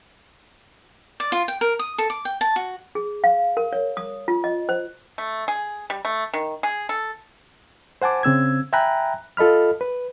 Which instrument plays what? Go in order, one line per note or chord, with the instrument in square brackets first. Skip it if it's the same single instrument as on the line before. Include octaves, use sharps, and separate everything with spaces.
[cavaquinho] D5
F4
G5
A#4
D#6
A4
D6
G5
A5
F#4
[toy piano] G#4
F5
A#4
C#5
D#6
F4
D#5
C5
[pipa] A3
G#4
G3
A3
D#3
G#4
A4
[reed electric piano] C5 F#5 G#5 A5 D6
C#3 C4 E6 G#6
E5 G5 G#5 A#5 B5 F#6
F4 A4 D#5 B5 F6
B4